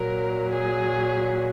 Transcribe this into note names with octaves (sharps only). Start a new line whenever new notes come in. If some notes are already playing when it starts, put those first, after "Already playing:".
Already playing: A#2 F#3 A#4
G#4